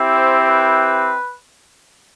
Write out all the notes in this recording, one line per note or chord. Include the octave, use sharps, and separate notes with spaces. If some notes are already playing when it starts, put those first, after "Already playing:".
Already playing: C4 E4 G4
C5
B4